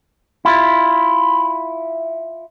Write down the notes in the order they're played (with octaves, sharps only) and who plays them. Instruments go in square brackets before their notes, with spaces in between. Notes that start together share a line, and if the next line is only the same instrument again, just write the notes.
[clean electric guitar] E4 F4